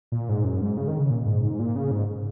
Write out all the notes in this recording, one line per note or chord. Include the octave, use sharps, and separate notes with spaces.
A#2
G#2
F#2
G#2
C#3
D#3
C#3
A#2
G#2
G#2
A#2
C#3
G#2